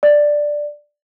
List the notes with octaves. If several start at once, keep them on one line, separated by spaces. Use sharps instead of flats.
D5